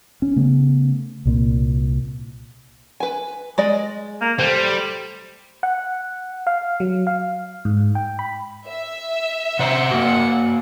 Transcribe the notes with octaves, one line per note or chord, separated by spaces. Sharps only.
C#4
C#3 A3 B3
C2 A#2
B4 G#5
G#3 D5 D#5
A#3
G3 A4 C5
F#5
F5
F#3
F5
G#2
G5
B5
E5
C3 C5 F#5 A#5
A#3 F#4